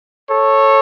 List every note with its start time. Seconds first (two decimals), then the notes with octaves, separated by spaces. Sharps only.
0.29 A4 C#5